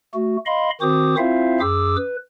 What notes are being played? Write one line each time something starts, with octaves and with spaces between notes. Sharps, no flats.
A3 F#4
D#5 F5 B5 C6
D#3 C4 F#4 C5 D6 D#6
C4 E4 F4 C5 E5 F5
F#2 G#4 D6 E6
B4